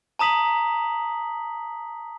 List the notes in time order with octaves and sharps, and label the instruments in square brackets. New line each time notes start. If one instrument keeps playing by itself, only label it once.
[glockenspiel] A5 A#5 D#6 B6 F#7